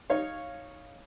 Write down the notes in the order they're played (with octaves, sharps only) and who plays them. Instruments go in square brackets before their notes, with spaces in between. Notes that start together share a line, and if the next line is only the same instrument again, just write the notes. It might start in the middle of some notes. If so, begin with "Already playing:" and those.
[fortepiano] D#4 C#5 F5